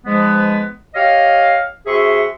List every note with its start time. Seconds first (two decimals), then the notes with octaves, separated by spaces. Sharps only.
0.05 G#2 F3 G#3 B3
0.94 G4 C#5 D#5 F5
1.86 C3 F#4 G#4 E5 C6 C#6